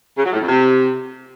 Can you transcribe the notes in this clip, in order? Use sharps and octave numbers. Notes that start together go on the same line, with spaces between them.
C#3
F#3
A2
F2
C3